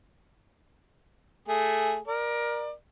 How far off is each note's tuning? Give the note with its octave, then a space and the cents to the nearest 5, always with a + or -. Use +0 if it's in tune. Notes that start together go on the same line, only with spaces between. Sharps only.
A3 +0 G#4 +0
A#4 +20 D5 +25